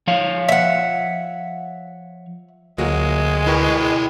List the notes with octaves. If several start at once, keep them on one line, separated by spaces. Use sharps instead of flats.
F3 C#5 F5
E5 F#5
D2 F#3 G#3 A#3 F4 F#4
E4 A#4 B4 G5 C#6